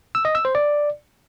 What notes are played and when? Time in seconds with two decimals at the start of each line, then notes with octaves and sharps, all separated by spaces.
0.15 E6
0.25 D#5
0.35 E6
0.45 C5
0.55 D5